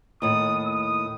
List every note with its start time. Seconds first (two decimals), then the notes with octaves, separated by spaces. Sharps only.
0.22 D#2 A2 D#6
0.66 D#6